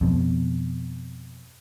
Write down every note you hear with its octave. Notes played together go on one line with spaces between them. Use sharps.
F2 B2